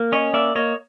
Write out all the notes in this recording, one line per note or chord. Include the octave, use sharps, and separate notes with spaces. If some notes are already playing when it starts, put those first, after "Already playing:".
Already playing: A#3
C#4 C#5 D#5
A#3 D5 E5
A#3 C#5 D#5